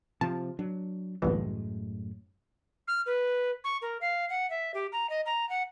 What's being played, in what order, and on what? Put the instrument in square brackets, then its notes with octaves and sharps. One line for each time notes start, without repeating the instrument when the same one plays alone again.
[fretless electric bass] C3 F3 [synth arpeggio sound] A5
[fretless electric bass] F#3 D4
[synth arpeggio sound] G1 C2 E3 [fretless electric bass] F#2 A2 G#3
[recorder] F6
B4
C#6
A#4
F5
F#5
E5
G4
A#5
D#5
A#5
F#5